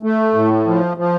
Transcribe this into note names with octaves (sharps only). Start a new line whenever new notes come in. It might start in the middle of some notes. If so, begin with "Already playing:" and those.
A3
A2
F3
F3